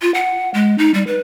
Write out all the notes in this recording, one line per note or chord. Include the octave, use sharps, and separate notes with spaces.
F4
F#5
G#3
D#4
G3
B4